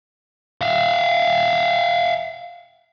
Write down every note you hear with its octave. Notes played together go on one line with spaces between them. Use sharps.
E5 F5